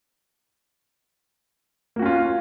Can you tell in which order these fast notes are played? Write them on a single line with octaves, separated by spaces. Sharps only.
A#3 F#4 C#4 F4